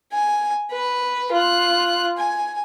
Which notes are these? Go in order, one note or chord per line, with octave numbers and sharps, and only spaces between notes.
G#5
B4
F4 F#6
G#5